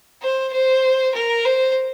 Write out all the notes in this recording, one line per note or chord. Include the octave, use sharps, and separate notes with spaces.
C5
C5
A#4
C5